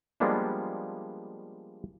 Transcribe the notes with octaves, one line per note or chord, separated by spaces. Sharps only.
F3 G3 G#3 A#3 B3 D4